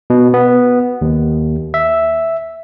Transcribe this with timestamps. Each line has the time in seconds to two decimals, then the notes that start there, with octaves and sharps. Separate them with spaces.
0.10 B2
0.34 B3
1.01 D#2
1.74 E5